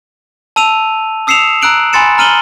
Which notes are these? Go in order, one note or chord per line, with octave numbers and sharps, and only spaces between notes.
A5 E6 D#7 F7
D#6 E6 C7 C#7 E7 F7
A#5 E6 F#6 D7 F#7
G#5 B5 C6 A6 C#7 E7
A#5 F6 D#7 F#7 G7